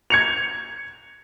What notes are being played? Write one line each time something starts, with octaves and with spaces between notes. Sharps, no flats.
G#6 C#7 F7